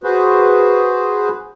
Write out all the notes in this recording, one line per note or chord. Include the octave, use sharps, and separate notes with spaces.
F#4 G#4 B4 C5